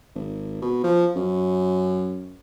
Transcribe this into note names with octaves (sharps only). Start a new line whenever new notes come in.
G#1
B2
F3
F#2